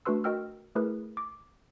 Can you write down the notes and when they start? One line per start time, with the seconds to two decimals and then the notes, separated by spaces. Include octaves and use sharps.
0.05 A3 D4 F#4 B4 C6 E6
0.24 F#4 A#4 D#5 G5 E6 F6
0.75 A3 E4 G#4 A#4 B4
1.17 D6